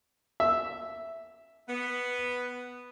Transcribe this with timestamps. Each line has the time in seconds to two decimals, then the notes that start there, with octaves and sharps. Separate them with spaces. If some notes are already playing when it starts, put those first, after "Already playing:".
0.40 E5
1.68 B3